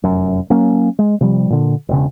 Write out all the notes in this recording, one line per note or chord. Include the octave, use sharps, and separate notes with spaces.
F1 F#2
F#3 A#3 C#4
G#3
C3 F3 G3
A#2 D3
E1 C#3